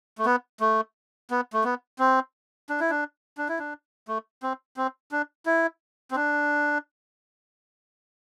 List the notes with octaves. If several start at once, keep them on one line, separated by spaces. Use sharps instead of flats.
A3
B3
A3
B3
A3
B3
C4
D4
E4
D4
D4
E4
D4
A3
C4
C4
D4
E4
C4
D4